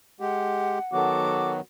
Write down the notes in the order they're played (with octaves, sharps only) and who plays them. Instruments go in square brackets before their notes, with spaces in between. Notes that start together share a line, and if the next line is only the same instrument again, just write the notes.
[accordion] G#3 G4 [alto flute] F#5
[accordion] D#3 F#3 B3 [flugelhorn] F#4 [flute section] A4 D6